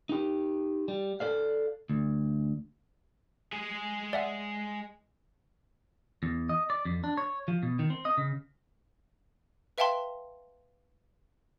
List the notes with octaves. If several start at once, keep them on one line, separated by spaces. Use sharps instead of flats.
D#4 G4
G3
A4 D5 F5
D2
G#3 G#4
D5 E5 F#5
E2
D#5
D5
F2
D4
C#5
F3
B2
D#3
C4
D#5
C#3
B4 E5 F5 G5 A5 C6